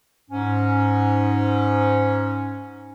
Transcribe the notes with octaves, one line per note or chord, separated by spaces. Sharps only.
G#2 C#4